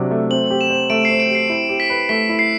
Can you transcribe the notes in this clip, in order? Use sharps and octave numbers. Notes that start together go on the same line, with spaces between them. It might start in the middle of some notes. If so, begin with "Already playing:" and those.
Already playing: C3 F#3 D4
A3
C4 F#7
G4
E7
C5
A3 D7
C7
C4
D7
G4
C7
E4
G4
B6
B4
A3 B6
E4
C7